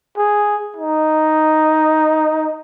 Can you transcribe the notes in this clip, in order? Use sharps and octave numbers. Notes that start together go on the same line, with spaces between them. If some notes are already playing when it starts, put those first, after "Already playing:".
G#4
D#4